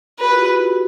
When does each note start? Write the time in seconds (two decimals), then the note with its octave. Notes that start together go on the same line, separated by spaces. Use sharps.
0.20 F#4 G#4 B4
0.29 F4 G4
0.39 E4 F#4
0.49 F4
0.60 E4